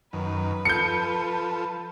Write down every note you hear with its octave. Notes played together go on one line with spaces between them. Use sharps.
F#2 D#3 B4
F3 A4 G6 C#7